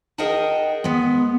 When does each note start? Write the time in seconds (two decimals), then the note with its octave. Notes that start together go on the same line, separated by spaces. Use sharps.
0.18 G#4 A#4 D#5 F#5 G5 A5
0.84 G#3 B3